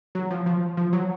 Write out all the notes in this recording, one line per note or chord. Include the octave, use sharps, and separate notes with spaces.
F#3
F3
F3
F3
F#3